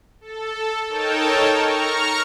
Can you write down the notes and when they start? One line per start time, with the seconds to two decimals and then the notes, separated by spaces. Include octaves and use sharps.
0.21 A4
0.88 D#4 A4 A#4 C#5 G5 A5
1.57 A#5 C#6 F6